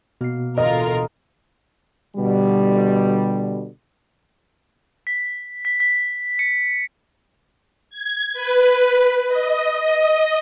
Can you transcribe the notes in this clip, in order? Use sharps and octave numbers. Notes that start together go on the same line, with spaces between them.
B2 A#3 C7
A1 D2 F4 A#4 D#5
B2 D3 G3
B6
B6
B6
C#7
G#6
B4
D#5